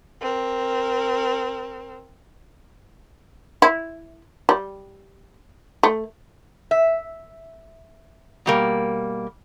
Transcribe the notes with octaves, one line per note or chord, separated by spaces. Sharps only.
C4 A#4
E4
G3
A3
E5
B2 G3 A#3